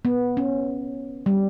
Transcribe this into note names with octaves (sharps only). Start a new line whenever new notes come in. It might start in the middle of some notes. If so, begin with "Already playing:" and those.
B3
C#4
G3